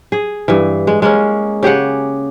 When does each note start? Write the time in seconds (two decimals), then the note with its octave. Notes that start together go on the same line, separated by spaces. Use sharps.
0.12 G#4
0.48 G2 E3
0.87 G#3
1.02 G#3 A#3 C#4
1.63 C#3 G4 G#4 F#5